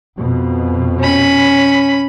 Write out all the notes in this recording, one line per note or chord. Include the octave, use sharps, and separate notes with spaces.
F2 B2
C#4 B5